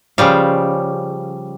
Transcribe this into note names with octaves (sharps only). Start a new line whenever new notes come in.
C#3 F3 G3 F5